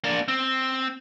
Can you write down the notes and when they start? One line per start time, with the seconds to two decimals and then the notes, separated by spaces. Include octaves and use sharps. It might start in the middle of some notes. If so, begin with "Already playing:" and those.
0.04 A#3 D4
0.28 C4